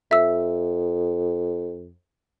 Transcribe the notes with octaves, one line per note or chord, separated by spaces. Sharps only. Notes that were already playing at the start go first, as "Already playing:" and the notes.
F2 E5 E6